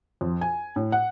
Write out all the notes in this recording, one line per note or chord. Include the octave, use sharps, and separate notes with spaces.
F2
G#5
A2
F#5